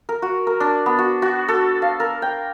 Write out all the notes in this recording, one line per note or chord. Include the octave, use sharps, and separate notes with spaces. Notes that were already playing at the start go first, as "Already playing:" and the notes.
A#4
F#4
A#4
D4
B3
F#4
F#4
A4
F5
A#4
G5